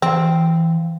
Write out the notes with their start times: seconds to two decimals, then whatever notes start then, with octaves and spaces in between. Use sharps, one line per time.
0.02 E3 C4 F5